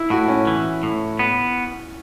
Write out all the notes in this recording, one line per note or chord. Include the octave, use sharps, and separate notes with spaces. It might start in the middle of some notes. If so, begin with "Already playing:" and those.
Already playing: E4
A2 F#4
C#4
E3
A2
B3